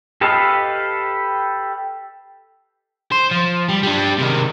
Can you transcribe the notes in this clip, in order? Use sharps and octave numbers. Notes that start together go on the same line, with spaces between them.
G4 A4 B4 D#5 F5
C5
F3
G3
G3 D4
C3 D#3